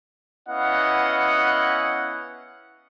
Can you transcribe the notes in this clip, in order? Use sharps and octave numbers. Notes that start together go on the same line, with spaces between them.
B3 C#4 E4 D#5 F5 F#5